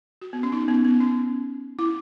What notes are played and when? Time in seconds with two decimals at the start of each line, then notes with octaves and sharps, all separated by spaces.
0.22 F#4
0.33 B3
0.43 C#4
0.52 D#4
0.68 B3
0.85 B3
1.00 C#4
1.79 E4